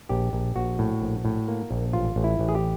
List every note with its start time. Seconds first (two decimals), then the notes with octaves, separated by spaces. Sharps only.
0.09 A#1 G4
0.33 A#1
0.56 A#1 F#4
0.79 A2
1.01 A#1
1.25 A2
1.48 A#3
1.71 A#1
1.93 A1 F4
2.16 A1
2.24 E4
2.39 A1
2.49 G#4
2.55 G4